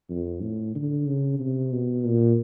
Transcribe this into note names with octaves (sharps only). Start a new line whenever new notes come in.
F2
A2
D3
C#3
C3
B2
A#2